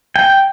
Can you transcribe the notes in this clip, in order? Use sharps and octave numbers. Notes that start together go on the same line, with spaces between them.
G5